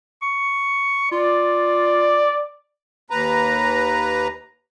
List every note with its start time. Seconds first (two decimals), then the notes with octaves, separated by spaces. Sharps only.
0.22 C#6
1.12 F4 D5
3.10 D#2 B4 A#5